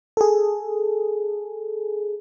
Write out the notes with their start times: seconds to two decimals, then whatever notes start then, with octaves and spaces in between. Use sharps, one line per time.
0.17 G#4 A4